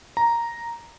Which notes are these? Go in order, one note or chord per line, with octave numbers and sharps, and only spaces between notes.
A#5